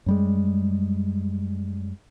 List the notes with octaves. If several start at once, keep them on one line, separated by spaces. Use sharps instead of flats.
F#2 G3 G#3